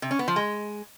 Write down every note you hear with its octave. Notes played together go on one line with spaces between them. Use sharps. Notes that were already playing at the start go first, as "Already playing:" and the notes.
C3
C#4
B3
F3
G#3